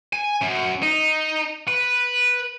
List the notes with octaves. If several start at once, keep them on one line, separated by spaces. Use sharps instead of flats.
G#5
F#2
D#4
B4